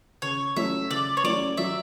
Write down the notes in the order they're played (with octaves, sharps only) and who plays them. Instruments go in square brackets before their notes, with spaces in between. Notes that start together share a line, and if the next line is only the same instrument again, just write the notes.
[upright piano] C#3 [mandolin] C#5
[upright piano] F#3 A3 C#4 E4 [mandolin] E5
[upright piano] C#3 [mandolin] D5
[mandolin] C#5
[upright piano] F#3 A3 C#4 E4 [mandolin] D5
[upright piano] F#3 [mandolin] E5